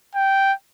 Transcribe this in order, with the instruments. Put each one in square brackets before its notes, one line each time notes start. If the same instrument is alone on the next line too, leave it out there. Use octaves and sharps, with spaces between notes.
[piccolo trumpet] G5